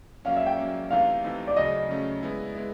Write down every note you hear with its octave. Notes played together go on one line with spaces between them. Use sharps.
F#3 A#3 C#4 F5
E5
G5
F#3 A#3 C#4
C3 E3 A3 C4 D#4 F5
C3 E3 A3 C4 D#4
D5
C#3 F#3 A3 C#4 D#5
C#3 F#3 A3 C#4
G#3 B3 E4
G#3 B3 E4